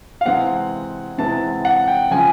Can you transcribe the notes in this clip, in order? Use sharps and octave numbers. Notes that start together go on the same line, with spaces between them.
F5
C3 E3 G#3 C4 F#5
C3 E3 G#3 C4 A5
F#5
G5
C#3 F3 G#3 G#5